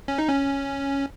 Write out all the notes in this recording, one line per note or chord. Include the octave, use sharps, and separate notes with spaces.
C#4
D#4
C#4